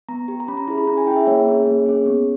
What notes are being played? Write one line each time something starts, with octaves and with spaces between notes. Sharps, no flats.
B3 A#5
G4
A#5
C#4 B5
A#5
E4 G#4 A#5
B5
C#4 A#5
G#5
E4 G#4 G5
E5
A#3 C#5
C#4 G#4
A#3
C#4 G#4
B3